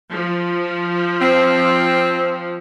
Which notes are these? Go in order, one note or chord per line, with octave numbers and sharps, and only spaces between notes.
F3
C4